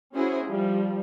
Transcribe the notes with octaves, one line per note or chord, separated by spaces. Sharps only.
C#4 E4 F#4 G#4 C5
F3 G3